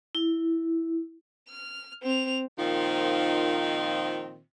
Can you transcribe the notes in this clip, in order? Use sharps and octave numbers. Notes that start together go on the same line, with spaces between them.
E4
F6
C4 F7
A#2 D#3 F3 C4 D#4 F4